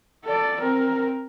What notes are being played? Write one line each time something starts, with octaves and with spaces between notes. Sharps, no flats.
A4 D5
C4 A#4